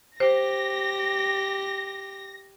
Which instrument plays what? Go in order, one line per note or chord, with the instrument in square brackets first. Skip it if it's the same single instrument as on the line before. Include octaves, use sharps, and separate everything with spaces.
[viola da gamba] G4 [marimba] C5 [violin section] A#6